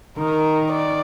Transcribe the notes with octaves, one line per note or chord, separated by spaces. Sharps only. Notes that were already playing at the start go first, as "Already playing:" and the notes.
D#3 A#4
D5